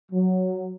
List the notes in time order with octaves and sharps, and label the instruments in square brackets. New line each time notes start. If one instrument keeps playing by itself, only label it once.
[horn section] F#3